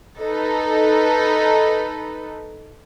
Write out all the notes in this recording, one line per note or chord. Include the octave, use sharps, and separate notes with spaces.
D#4 A4 B4